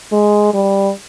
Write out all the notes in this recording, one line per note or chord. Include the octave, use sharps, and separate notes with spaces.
G#3
G3